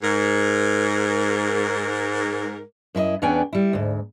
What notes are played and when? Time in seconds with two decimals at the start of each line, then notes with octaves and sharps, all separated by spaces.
0.02 G#2 A#4
2.95 F#2 E4 B4 D#5
3.22 E2 B3 C#4 D4 G5 G#5
3.53 G3 E4
3.73 D2 G#2